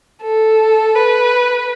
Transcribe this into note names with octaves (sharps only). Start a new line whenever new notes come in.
A4
B4